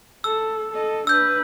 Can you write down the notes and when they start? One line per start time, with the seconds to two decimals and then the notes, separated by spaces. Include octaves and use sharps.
0.24 A4 E6
0.72 A4 D#5
1.07 D4 B4 E6 G6